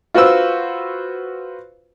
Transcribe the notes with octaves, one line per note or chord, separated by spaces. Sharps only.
F4 F#4 B4 C5 E6